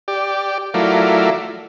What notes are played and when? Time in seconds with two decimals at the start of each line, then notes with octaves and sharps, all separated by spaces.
0.08 G4 D5
0.74 F#3 A3 E4 F4 A#4 D5